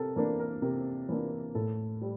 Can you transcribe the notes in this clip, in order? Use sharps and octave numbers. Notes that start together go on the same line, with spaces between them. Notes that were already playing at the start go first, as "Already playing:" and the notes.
Already playing: C3 A4 A#4
E3 A#3 D4 A#4
A#4
C3 A#4
E3 A#3 D4
A2 A4
G3